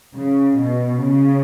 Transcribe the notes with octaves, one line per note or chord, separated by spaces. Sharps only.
C#3
B2
C#3